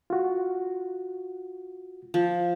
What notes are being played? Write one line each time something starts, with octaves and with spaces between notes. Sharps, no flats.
F4 F#4
F3